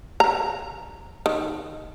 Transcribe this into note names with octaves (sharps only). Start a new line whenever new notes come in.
A#5
D#3